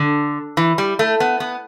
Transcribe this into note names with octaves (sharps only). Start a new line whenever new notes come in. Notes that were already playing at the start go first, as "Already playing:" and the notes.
Already playing: D3
E3
G3
A3
B3
B3